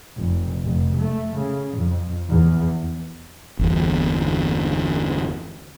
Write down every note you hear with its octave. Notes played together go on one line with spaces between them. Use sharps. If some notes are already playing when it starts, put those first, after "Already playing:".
F1
F1
A3
C#3
F2
E2
G1 E2